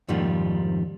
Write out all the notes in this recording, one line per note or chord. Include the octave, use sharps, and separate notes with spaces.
F2 G#2 D#3 F3 G3 A#3